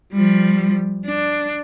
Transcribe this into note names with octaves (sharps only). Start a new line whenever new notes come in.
F3 G3
D4